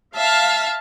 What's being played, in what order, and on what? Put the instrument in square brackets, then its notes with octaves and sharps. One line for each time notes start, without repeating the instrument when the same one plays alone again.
[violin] E5 A5 [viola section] F5